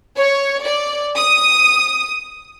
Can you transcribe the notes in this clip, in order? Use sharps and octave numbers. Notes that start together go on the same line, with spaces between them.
C#5
D5
D#6